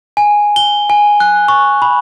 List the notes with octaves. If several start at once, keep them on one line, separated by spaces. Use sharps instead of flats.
G#5
G7
G#5
F#6
C#6
B5